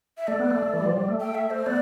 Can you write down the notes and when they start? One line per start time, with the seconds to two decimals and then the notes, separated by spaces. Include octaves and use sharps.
0.17 E5
0.27 A3 D5
0.39 B3
0.50 A3
0.62 A3
0.73 E3
0.81 G3
0.86 F3
0.97 G3
1.08 A3
1.20 G5
1.35 E5
1.50 C5
1.66 B3 D5